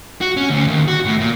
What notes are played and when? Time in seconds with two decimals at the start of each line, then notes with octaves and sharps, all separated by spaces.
0.21 F#4
0.37 C#4
0.50 D2
0.67 D#2
0.88 F#4
1.05 A2
1.20 A#2